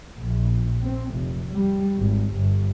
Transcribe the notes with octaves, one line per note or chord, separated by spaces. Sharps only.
A#1
C4
F1
G3
G#1
G1